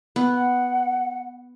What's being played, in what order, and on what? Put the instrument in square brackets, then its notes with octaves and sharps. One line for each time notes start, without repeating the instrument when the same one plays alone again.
[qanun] B3
[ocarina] F#5